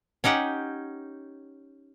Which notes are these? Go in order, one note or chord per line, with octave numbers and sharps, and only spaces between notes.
C#4 D#4 G4 F#5